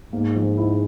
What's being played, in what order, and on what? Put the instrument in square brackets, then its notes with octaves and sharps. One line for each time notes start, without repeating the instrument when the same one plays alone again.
[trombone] G#2 [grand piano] A#3
[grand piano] F3
E4